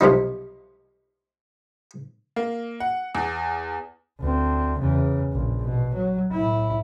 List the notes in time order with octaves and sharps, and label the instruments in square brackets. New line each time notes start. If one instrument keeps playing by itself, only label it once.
[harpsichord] B1 C3 F3 D#4
[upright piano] A#3
F#5
E2
[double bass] D2 C4
E2 C#3
A#1
B2
F#3
A2 E4